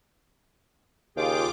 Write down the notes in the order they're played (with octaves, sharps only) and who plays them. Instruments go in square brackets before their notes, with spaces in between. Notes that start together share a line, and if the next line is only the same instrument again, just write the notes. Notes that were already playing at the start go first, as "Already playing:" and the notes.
[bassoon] D#2 [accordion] C#3 G#4 G5 [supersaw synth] F4 D6